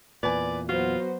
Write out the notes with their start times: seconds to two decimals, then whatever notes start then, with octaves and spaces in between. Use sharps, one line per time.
0.23 E2 A#2 B4 D5 G#5
0.69 F#3 B3 F4 F#4 C5